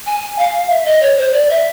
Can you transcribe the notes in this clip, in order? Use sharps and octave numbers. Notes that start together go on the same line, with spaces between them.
G#5
F5
E5
D#5
C#5
C5
D5
E5